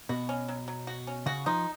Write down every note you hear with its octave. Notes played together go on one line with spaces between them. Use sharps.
B2 F#4
C#4
F#3
F#3
F#4
C#4
C#3 F#4
F3 D#4